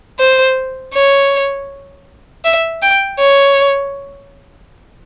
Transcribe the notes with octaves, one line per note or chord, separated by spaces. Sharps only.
C5
C#5
E5
G5
C#5